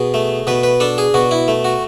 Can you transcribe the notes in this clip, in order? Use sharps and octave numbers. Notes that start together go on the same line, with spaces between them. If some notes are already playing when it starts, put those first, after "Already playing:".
Already playing: B2 G#4
A3
B2 B4
B4
D4 A4
G#4
B2 F#4
E4
A3
F#4